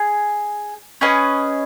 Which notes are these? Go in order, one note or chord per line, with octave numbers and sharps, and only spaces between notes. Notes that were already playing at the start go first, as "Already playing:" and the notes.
Already playing: G#4 G#5
C#4 G#4 B4 D#5